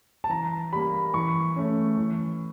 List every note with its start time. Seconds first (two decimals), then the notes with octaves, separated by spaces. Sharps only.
0.24 A5
0.30 E3 A#5
0.72 G3 A#3 B5
1.14 E3 C#6
1.56 A3 C#4
1.97 E3